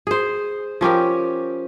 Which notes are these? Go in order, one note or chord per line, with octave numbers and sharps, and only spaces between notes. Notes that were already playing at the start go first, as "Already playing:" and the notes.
G#4 C5
F3 C#4 G4 A#4